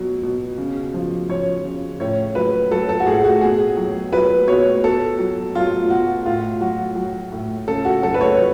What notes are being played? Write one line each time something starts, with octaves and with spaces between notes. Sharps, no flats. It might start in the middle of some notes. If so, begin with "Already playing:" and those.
Already playing: B2 F#3
B2
C#3
F3
F3 C#5
C#3
A2 C#5
F#3 B4
F#3 A4
A4
F#4
A2 G#4
F#4
B2 G#4
F#3
F#3 B4
B2 C#5
B2 A4
F#3
F#3 F4
B2 F#4
A2 F4
F#3 F#4
F#3
A2
C#3 A4
F#4
F#3 A4
B4
C#5
F#3